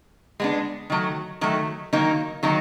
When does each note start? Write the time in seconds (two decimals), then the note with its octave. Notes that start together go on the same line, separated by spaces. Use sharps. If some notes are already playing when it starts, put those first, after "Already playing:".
0.40 G#3 B3 D4
0.90 D#3 F#3 A3
1.41 D#3 F#3 A3
1.93 D#3 F#3 A#3 D#4
2.43 D#3 F#3 A#3 D#4